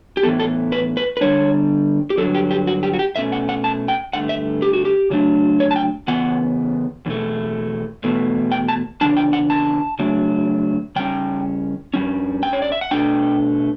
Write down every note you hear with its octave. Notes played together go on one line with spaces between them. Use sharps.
G4
A2 E3 B3 A4
A4
B4
B4
B4
D3 G3 D4 C#5
G4
G2 D3 F#3 A4
G4
G4
F#4
G4
F#4
G4
B2 A3 C#4 E5
F#5
F#5
A5
G5
G2 D3 A3 F#5
E5
G4
F#4
G4
C#3 F#3 A3 D4
C#5
A5
G5
C#3 E3 B3 F#5
E2 B2 A3
E2 B2 A3
G5
A5
E2 C#3 G3 D4 A5
G5
F#5
A5
C#3 F#3 A3 D4
C#3 G3 C#4 G5
G2 D3 G3 C#4
G5
C#5
D5
E5
F#5
B2 A3 D4 G5